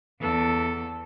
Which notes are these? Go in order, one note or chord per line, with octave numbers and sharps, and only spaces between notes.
E2 A4